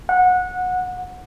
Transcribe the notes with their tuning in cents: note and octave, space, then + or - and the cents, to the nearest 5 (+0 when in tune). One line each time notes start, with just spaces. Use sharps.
F#5 -20